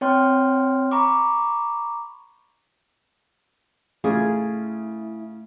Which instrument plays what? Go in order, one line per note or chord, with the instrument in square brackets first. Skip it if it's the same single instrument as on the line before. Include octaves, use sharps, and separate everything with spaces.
[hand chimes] C4 C#5 G5 C6 F6
A#5 B5 C#6 D6
[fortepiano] C#3 F4 [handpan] A3 [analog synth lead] E4 [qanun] G#4